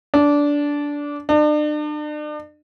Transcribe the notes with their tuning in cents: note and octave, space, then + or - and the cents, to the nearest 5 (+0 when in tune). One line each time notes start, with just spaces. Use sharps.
D4 -15
D4 +40